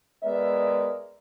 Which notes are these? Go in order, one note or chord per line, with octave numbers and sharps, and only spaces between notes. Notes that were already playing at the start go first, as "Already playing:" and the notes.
G#3 B3 A#4 D5 E5